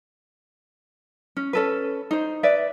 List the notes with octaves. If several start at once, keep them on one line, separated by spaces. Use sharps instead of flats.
C#4
C#4 A4 B4
D#4 C5
B4 D5 E5